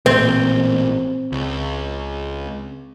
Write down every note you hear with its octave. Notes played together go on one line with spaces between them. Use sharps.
A1 A#2 C4
C#2